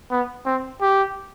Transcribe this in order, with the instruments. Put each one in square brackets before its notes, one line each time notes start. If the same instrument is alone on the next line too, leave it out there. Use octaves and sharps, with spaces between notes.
[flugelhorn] B3
C4
G4